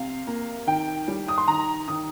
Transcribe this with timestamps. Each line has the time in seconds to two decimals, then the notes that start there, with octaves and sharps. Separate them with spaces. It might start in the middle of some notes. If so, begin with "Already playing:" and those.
Already playing: C3 F5
0.27 A#3
0.67 D#3 G5
1.08 G3
1.28 D#6
1.38 C6
1.48 D#3 A#5
1.88 D#3 D#6